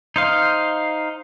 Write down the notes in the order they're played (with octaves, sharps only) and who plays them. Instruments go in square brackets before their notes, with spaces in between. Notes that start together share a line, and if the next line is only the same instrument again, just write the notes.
[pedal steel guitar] D#4 C5 F5